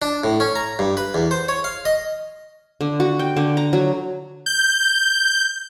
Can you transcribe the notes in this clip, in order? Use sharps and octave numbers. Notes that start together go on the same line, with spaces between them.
D4
A2
C#4
A#5
G2
B4
E2
C5
C#5
F5
D#5
D3
F#4
G5
D3
A#5
F#3
G6